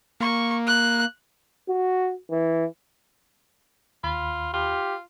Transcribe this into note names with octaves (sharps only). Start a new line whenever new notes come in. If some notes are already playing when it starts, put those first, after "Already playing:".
A#3 C#6
F#6
F#4
E3
D#2 F4 B5
F4 G4